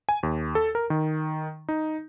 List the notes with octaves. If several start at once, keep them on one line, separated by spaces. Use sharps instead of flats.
G#5
D#2
A4
A#4
D#3
D#4